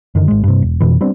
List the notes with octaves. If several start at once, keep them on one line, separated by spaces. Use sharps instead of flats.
F#2 D3 D#3
G#1 G#3
G2 C3
E1
F2 B2 E3
G3 B3 C4 D4